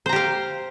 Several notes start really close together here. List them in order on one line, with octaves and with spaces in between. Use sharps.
C5 A#5 G4 F5